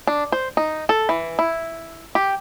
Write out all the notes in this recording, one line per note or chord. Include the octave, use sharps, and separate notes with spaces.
D4
C5
D#4
A4
E3
E4
G4